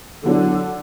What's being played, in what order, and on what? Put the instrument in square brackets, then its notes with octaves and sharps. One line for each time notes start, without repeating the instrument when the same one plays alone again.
[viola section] D3 [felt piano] F#3 B3 E4 A4 C#5